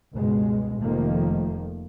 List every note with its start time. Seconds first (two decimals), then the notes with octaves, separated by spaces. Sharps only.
0.14 C#2 G2 B2 G#3
0.80 F1 D#3 F3 A3 A#3